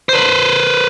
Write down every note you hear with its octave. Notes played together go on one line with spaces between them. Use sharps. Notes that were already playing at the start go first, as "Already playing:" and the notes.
B4 C5